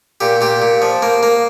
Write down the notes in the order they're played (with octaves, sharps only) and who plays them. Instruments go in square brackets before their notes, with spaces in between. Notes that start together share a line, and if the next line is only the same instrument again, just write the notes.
[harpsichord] A#2 G4
A#2 G4
A#2
F3
A#3
A#3